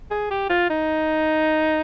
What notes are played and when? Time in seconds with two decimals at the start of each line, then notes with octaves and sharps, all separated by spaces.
0.11 G#4
0.31 G4
0.49 F4
0.70 D#4